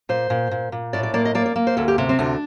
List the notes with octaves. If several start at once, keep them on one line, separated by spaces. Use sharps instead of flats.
A#2 C5
A#2
A#2
A#2
A2 D5
D5
A#3 D5
D#5
A#3 D5
D5
A#3
C5
D2 A4
G4
C3
C4
D2 D4